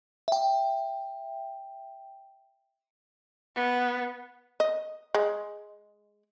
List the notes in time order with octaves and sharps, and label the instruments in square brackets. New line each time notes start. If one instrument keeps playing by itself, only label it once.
[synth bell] E5 G5
[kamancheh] B3
[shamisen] D#5
G#3